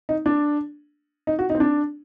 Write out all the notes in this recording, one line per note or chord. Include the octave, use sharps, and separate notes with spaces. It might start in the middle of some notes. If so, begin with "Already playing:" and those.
D#4
D4
D#4
F#4
D#4
C4
D4